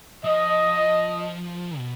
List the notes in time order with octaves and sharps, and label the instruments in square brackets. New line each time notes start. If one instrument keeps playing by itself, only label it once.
[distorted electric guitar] F3 [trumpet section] D#5
[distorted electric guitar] B2